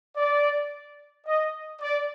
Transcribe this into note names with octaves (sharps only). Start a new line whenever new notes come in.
D5
D#5
D5